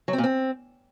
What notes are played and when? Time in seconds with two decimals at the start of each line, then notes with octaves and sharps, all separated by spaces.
0.08 F#3
0.13 C4
0.18 A#2
0.24 C4